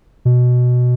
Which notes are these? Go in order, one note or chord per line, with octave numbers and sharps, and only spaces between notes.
B2